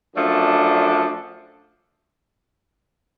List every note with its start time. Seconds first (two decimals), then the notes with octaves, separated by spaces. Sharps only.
0.15 F#2 F3 A3 D4